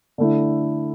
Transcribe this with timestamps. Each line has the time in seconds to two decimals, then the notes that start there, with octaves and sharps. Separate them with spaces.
0.18 D3 A3 E4